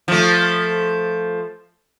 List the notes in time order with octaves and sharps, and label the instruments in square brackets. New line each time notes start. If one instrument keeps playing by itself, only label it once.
[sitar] F3 A3